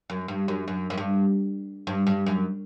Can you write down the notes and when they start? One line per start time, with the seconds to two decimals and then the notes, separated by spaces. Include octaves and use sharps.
0.10 F#2
0.28 G2
0.48 F#2
0.68 F#2
0.90 F#2
0.98 G2
1.87 G2
2.07 G2
2.26 F#2